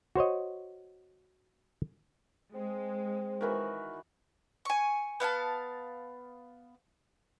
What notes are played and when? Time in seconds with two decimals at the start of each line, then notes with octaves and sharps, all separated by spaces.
0.16 F#4 C5 C#5 D#5
2.54 G#3 C4
3.41 D#3 E3 F#4 A#4 B4
4.65 G#5 C#6
5.20 B3 F5 G#5 A5